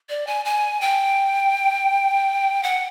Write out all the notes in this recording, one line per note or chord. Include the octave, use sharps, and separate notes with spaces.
D5
G#5
G#5
G5
F#5